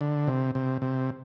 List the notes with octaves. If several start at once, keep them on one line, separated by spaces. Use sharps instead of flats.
D3
C3
C3
C3